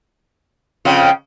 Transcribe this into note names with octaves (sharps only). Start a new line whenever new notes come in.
F2 C#3 F4 G5